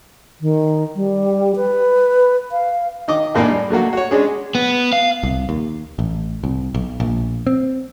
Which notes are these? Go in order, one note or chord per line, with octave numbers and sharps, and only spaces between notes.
D#3
G3
B4
F5
D#3 D#5 D6
D#2 A2 A#3 D4 G#5
G3
F#3 A3 A#3 F#4
F#4 C#5
G#3 C#4 D4 G#4
B3
F5
C2
D#2
A1
C2
B1
A#1
C4